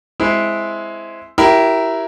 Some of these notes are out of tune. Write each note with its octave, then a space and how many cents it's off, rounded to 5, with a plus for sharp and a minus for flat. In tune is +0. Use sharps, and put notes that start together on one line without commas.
G#3 +5 C4 -5 E4 +0
E4 +0 G4 -30 A#4 +5